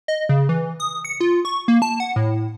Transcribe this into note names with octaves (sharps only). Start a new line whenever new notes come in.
D#5
C#3
E3
D#6
C#7
F4
C#6
A#3
A5
F#5
A2